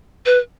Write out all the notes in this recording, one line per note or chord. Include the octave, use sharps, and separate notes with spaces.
B4